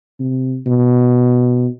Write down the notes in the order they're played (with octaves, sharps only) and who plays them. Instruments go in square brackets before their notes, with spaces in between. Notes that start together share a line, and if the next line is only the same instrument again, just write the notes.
[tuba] C3
B2